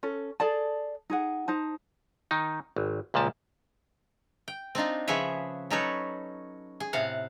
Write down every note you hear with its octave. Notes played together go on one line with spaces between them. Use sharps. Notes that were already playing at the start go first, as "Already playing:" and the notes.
C#4 A4
G#4 A4 D5 A5
D#4 G#4 F#5
D#4 C5 A5
D#3 D#4
G#1
C#2 A#2 F3 A5
G5
C4 D4 D#4 F4
C#3 F3 G#4 B4 C#5 E5
F#3 C#4 D#4 A4 B4 C#5
G#4
A2 C3 F5 F#5